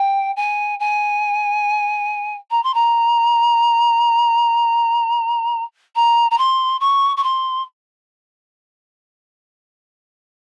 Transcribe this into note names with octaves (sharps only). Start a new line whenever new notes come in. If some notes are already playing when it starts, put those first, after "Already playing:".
Already playing: G5
G#5
G#5
A#5
C6
A#5
A#5
A#5
C6
C#6
C#6
C6